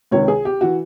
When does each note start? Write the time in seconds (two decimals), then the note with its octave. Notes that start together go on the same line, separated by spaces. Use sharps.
0.11 C#2 C3 D#3 C#5
0.28 G#4
0.45 G4
0.61 E3 F#4